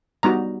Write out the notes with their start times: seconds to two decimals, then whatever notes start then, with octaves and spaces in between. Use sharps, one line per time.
0.23 G3 B3 D#4 F#4 A#5